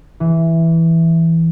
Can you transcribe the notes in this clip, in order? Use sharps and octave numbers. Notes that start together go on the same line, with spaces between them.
E3